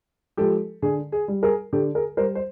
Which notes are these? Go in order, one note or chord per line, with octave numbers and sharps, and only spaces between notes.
F3 G#3 G4 A4
D3 G#4
G#4
G3
G#4 A#4
D3 G4 A4
G#4 A#4
G3 A#4 C5
C5